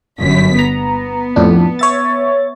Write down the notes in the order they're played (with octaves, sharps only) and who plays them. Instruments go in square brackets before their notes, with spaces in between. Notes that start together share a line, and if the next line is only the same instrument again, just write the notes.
[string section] G1 F#2 B6
[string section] B3 [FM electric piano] A#5
[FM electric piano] F2 A2 D4
C#5 E5 A6